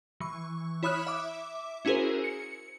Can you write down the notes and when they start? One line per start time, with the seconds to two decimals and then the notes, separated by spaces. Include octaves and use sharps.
0.20 E3 C#6
0.83 E4 C#5 B5 D#6 F6 F#6
1.07 E5 D6
1.85 C#4 E4 F#4 G#4 A#4 C5
2.24 C#7